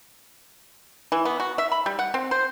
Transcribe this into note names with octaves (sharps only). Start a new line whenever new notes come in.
E3
B3
F#4
E5
B5
G3
F#5
C4
C5